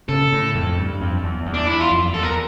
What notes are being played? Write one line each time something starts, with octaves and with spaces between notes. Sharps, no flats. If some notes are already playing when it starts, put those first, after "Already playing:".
C#3 A4
A2
F2
G2
F2
E2
E2
D4
E4
F4
F2
E2 A4
A#4